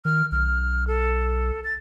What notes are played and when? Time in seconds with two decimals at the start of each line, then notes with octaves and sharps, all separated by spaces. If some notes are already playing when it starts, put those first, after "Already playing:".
0.05 D#3 F6
0.32 B1 F6
0.87 A4
1.64 A6